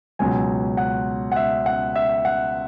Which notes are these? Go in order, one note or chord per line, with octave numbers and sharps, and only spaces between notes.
C#2 B2 F#3 G#5
F#5
F#5
E5
F#5
E5
F#5